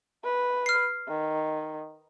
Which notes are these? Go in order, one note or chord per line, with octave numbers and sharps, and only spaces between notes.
B4
F6 C7
D#3